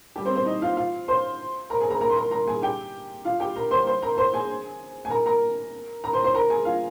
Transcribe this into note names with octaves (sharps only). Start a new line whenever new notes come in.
G3 G4
C4 C5
C4 C5
D#4 D#5
F4 F5
F4 F5
C5 C6
A#4 A#5
G#4 G#5
A#4 A#5
A#4 A#5
C6
A#4 A#5
A#4 A#5
G#4 G#5
G4 G5
F4 F5
G4 G5
A#4 A#5
C5 C6
C5 C6
A#4 A#5
C5 C6
G#4 G#5
G#5
A#4 A#5
A#4 A#5
A#4 A#5
C5 C6
C5 C6
A#4 A#5
G#4 G#5
F4 F5